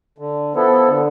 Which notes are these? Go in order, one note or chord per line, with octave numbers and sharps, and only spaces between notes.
D3
F3 B3 E4 A4
D3